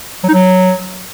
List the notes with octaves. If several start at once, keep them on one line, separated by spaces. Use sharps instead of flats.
F#3
D#4
F#3